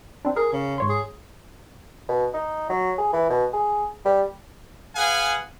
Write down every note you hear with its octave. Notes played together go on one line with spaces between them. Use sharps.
C4 D4
G#4 A#4
C#3
G#2 C#5 C6
G#4
B2
D#4
F#3
G#4
E3
B2
G#4
G3
G#4 B4 F5 F#5 G#5